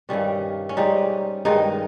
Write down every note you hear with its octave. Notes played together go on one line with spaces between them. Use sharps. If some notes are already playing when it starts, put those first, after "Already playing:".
G2 D#3 G3 C#4
C#4
G#2 G3 D#4
G2 D#3 G#3 D#4